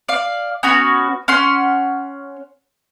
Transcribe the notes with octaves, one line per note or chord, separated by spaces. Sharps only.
D5 F5
B3 C#4 F#4
C#4 F#5 C6